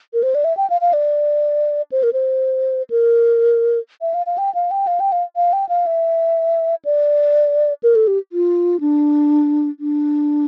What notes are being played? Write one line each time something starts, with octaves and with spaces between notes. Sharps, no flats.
A#4
C5
D5
E5
G5
F5
F5
D5
C5
A#4
C5
A#4
E5
F5
F5
G5
F5
G5
F5
G5
F5
F5
G5
F5
E5
D5
A#4
A4
G4
F4
D4
D4